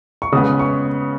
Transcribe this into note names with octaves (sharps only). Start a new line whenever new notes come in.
C#6
C#3 G#3 B3 D#6
C#6